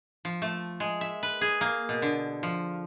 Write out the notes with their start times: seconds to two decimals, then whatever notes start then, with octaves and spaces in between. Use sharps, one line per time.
0.25 F3
0.42 A3
0.80 G#3
1.01 E5
1.23 B4
1.41 G#4
1.61 A#3
1.89 B2
2.02 D3
2.43 F3